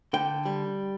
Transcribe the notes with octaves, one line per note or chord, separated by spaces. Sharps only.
D3 G5
G3